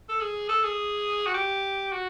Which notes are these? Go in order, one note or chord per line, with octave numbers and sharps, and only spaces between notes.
A4
G#4
A4
G#4
F#4
G4
F#4